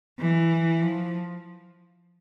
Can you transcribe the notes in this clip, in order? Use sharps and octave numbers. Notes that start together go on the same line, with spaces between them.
E3
F3